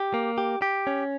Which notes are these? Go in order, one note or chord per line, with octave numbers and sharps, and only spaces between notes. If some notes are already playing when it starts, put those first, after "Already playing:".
Already playing: G4
A#3
G4
G4
C#4